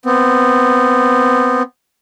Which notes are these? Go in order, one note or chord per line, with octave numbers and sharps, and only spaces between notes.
B3 C4